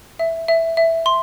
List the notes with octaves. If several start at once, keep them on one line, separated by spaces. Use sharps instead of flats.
E5
E5
E5
C6